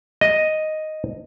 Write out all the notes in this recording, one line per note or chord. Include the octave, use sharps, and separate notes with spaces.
D#5